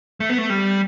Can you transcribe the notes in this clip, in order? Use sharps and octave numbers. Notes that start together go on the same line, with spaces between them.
A3
B3
A3
G3